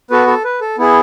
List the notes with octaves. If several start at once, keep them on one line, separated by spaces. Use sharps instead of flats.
B3 F#4 A4 B4
A4
B4
A4
B3 E4 G#4